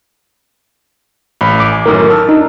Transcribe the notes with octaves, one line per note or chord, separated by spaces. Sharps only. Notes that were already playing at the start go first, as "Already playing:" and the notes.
A1 B5
D6
G#5
F#2 A2 D#3 A#4
A5 E6 F6
D4 D#4